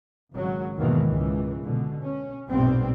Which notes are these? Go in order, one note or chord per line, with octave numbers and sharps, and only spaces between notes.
G#1 C#3 F#3
E2 G#2 B2 D#3 E3 A#3
C#2 E3
B2 D3
C#4
B1 G2 A#2 G3 B3 C4